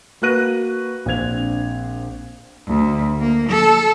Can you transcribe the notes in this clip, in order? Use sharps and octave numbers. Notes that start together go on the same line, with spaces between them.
A#3 F#4 B4 F#6 A#6 D#7
A#1 C4 D4 G#6 F7
D2
A#3
A4